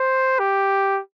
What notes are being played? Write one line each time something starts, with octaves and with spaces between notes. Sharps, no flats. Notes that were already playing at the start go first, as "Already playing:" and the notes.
Already playing: C5
G4